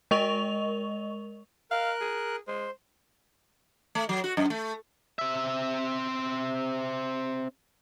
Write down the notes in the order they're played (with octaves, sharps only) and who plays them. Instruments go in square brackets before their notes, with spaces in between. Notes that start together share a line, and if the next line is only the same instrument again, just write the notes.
[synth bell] G#3 A#4 D#5 C#6 F7
[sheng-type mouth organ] A#4 F#6 [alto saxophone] F5
[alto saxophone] G#4
[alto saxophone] G#3 [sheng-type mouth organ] C5
[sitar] A3
F#3
F#4
F#2
A3
[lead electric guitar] C4 E5